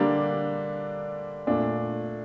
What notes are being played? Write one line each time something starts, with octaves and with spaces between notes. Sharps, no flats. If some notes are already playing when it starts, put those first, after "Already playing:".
Already playing: D3 G3 A#3 D4
A#2 A3 D4